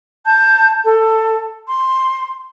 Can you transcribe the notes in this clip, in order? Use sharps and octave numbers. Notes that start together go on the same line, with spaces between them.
A5 G6
A4
C6